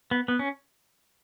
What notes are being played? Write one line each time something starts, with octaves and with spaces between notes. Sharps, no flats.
B3
B3
C#4